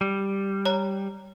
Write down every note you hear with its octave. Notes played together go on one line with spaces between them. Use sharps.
G3
C#5 A#5